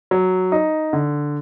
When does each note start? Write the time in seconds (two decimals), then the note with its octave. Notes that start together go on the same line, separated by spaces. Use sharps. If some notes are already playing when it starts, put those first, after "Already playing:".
0.11 F#3
0.52 D#4
0.93 D3